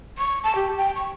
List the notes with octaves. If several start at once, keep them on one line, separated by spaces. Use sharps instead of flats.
C#6
A5
G4
G5
C#6